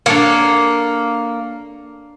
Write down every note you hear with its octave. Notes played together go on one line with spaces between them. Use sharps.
A#3 D4 A4 C#5